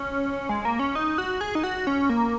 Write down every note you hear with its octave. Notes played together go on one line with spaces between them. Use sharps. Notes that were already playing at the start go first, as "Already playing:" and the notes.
Already playing: C#4
G#3
A#3
C#4
D#4
F#4
G#4
D#4
F#4
C#4
A#3